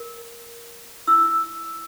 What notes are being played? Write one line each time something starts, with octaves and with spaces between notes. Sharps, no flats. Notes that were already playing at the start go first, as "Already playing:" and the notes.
Already playing: A#4
E4 E6